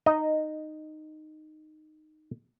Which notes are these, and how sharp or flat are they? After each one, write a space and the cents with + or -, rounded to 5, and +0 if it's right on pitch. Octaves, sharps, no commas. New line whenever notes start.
D#4 -10 D#5 +0